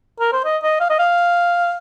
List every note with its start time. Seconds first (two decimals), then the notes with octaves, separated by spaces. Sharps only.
0.20 A#4
0.33 C5
0.45 D#5
0.63 D#5
0.81 F5
0.90 D#5
0.99 F5